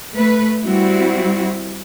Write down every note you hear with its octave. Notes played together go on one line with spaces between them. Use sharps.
A3 B4
G3 C4 E4 F#4